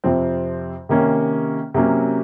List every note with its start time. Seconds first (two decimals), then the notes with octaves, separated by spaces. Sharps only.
0.04 F2 C3 F3 C4
0.89 C3 D#3 A#3 C#4
1.75 C3 F#3 A#3 C#4